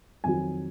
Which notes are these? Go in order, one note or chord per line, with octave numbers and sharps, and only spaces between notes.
F2 D#3 F#3 G#5